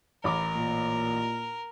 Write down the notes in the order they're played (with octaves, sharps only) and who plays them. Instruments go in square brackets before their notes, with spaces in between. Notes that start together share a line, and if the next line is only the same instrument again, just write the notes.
[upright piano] A1 B5 D6 [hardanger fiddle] A#4
[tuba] A#2